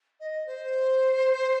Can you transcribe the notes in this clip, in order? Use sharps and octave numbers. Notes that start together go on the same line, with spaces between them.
D#5
C5